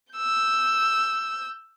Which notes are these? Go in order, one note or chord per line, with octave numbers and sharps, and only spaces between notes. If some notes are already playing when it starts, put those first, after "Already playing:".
E6 G6